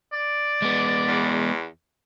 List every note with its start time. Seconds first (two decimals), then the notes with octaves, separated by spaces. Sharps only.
0.13 D5
0.62 G#3 B3
1.08 E2